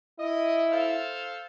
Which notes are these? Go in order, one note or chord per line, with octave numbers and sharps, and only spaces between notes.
E4 D#5
A4 C5 F5